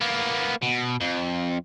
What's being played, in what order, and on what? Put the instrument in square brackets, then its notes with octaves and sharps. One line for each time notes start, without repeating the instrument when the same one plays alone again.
[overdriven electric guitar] A#3 B3
B2
F2